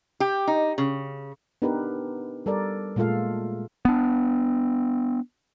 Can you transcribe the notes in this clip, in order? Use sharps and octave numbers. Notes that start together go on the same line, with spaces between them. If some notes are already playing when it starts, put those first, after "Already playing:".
G4
D#4
C#3
B3 D4 D#4 G4 A#4 B4
G3 A4 A#4 D5
A#2 G#3 A3 F4 A4 F5
B3 D4